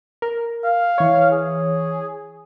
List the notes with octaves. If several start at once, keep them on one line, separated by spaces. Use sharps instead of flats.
A#4
F5
E3 C#5
G#4